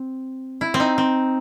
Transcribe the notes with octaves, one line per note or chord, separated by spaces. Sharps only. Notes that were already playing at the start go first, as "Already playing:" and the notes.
Already playing: C4
E4
C4
D#4
C4